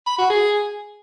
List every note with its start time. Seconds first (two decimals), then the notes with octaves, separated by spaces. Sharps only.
0.07 B5
0.18 F#4
0.30 G#4